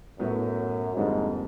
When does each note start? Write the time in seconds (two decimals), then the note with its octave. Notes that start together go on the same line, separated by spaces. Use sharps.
0.19 F#2 A2 F#3 B3 E4
0.96 F2 G#2 D3 G3 A#3 D4